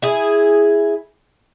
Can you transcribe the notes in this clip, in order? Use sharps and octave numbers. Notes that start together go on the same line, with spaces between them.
E4 G#4